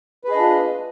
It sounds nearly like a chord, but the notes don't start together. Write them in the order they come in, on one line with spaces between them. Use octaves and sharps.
B4 G#4 D#5 D4 F4